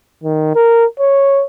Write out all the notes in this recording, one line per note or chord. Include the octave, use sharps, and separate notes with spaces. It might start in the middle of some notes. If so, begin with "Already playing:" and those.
D#3
A#4
C#5